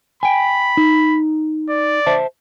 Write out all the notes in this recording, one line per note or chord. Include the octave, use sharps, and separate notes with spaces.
G5 G#5 B5
D#4
D5
C5 E5 A5